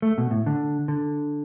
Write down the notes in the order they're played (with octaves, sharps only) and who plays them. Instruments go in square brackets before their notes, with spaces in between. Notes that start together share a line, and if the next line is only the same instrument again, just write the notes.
[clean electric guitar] A3
B2
A2
D3
D3